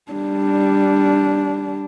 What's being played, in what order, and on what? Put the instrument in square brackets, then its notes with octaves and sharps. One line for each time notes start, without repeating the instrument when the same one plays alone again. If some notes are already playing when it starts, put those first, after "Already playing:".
[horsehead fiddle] G3 D4